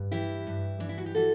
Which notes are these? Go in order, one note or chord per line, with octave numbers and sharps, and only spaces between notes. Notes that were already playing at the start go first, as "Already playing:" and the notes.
Already playing: G2
E3 E4 G4
G2
E3 D4
E4
F#4
G4
E3 F#4 A4